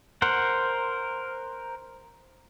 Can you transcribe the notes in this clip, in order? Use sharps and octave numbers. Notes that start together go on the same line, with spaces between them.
A#4 C5 F#5